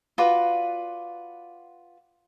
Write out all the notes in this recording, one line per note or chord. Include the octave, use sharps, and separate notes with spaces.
F4 F#4 B4 D5